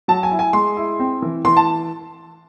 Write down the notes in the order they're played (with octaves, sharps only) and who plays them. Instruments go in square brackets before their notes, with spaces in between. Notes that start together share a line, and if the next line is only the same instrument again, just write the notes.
[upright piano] F#3 A5
G#5
E4
G#5
G#3 C6
E4
C4
E3
E3 C6
A5